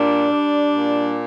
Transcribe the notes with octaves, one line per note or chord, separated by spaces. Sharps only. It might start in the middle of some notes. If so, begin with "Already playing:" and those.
Already playing: A#2 G3 D4
G3
A#2